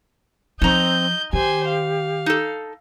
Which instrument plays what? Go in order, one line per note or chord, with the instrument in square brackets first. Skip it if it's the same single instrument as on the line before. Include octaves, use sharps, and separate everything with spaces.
[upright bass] F3 [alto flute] C4 [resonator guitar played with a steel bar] D#4 A#5 [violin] D#5 G6
[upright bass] D#3 [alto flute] G4 [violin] C5 G#5
[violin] F5
[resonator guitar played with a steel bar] D#4 A4